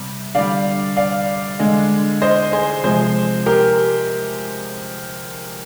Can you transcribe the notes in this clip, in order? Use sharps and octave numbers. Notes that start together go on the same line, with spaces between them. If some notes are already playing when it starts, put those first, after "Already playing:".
Already playing: C3 G3
D3 G3 D5 F5
D5 F5
D3 G#3
C5 D#5
G#4 C5
C3 F3 G#3 G#4 C5
G4 A#4